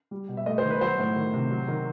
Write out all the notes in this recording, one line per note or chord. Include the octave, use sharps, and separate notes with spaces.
G3
B2
E5
A3 D#5
C5
D#3
B4
F#3 C5
A2
D#3
C3
F#3
D#3